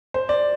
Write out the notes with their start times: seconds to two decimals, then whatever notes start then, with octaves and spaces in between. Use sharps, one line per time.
0.14 C5
0.29 D5